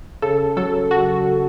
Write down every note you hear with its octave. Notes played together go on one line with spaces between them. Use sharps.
C#3 A4
F#3 A4
F#4